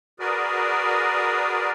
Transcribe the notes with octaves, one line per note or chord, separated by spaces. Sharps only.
F#4 G#4 A#4 B4 D5